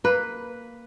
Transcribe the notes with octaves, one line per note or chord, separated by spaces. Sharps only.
A#3 B4